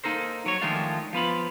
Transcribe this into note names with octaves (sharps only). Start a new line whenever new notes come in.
A#3 D#4 A4 A#4 C5
F#3 C#5
D#3 F3 G#3 A3 D4 F4
F3 B3 F4 B5